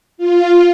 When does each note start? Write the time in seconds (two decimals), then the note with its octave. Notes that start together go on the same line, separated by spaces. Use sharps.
0.18 F4